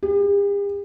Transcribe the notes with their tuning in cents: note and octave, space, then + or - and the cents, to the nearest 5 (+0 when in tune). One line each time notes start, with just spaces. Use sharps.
G4 +45